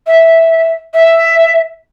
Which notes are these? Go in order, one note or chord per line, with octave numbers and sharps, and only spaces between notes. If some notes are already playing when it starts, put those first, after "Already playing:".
E5
E5